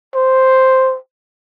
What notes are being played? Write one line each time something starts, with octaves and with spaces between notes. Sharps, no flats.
C5